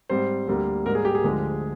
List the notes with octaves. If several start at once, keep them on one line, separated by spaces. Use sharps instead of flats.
G#2 G3 C4 C5
D2 D3 G3 A#3
G#2 G3 A#3 A#4
G#4
G4
G#4
D2 D3 F3 G#3